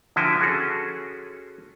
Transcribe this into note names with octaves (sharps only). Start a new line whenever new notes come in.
D3 F3 E4 F#4 G5 G#5
C#4 F#4 G#4 A4